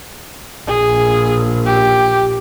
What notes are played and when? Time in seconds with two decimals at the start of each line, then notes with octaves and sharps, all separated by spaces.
0.67 A#1 G#4
1.66 G4